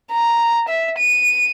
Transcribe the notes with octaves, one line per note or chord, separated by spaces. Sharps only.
A#5
E5
D#7